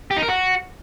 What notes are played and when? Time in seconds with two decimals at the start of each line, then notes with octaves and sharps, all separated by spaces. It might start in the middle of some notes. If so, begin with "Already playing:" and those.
0.11 G4
0.17 D#4
0.22 A#4
0.28 F#4